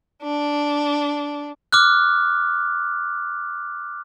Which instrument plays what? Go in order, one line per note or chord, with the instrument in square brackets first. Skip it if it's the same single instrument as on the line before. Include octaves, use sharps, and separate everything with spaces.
[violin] D4
[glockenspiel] D6 F6 F#6